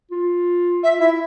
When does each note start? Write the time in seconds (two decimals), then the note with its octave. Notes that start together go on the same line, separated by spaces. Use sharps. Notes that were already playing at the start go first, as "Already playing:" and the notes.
0.11 F4
0.82 F4 E5
1.00 E4 E5